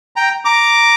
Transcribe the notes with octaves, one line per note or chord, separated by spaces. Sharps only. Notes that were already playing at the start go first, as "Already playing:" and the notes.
G5 A#5
A#5 D6